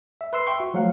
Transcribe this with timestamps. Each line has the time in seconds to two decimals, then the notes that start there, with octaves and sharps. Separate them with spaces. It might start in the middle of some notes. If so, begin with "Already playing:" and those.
0.21 E5
0.33 B4 C6 E6 C7
0.47 E5 G5 C6 C#6
0.60 F#4
0.74 F3 F#3 A3 F5 F#5